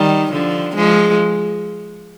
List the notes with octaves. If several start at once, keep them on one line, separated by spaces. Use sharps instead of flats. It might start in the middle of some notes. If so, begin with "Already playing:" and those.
Already playing: D#3 G3
D3 F3
F3 G#3